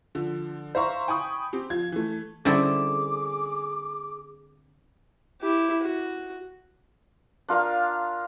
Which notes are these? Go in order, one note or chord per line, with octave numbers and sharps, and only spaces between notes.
D3 F3
C5 E5 F5 A#5 C#6
G5 G#5 B5 C#6 D#6
C4 G4
F3 F4 G#6
E3 A3
D3 G3 C4 C#4 E4 G#4 D6 A6
E4 G4
F#4
D4 F4 A#4 F5